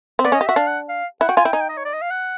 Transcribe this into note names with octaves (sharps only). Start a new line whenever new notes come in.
C4
B3 D5
C#4 D#5
G4
F#4 E5
D4 F5
F#5
F5
E4 F#5
F#4 G5
F4 G#5
E4 G5
D#4 G#5
G5
D#5
C#5
D5
D#5
F5
F#5